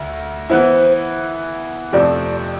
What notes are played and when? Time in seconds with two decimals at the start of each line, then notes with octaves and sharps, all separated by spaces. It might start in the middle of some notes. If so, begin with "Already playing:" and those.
Already playing: D2 E4
0.49 E3 B3 E4 C5
1.93 F2 C3 F3 A3 C4 D5